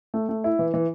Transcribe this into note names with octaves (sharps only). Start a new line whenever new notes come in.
A3
A3
E4
E3
E3